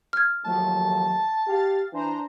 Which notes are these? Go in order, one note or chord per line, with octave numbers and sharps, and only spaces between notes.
F6 G#6
D#2 F3 F#3 A3 A5
G4 F5 A6
E3 D4 C5 A#5